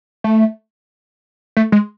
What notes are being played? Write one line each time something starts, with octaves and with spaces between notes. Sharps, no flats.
A3
A3
G#3